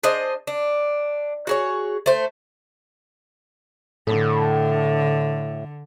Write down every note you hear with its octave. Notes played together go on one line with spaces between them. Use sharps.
D4 G#4 C5 D#5
D4
F#4 G#4 C#5
A3 C5
A2 D3 A4